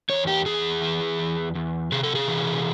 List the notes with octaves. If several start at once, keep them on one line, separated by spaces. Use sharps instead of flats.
E2 C#5
G4
E2 G#4
E3
E2
E2
C3 G#4
A4
G#4
E3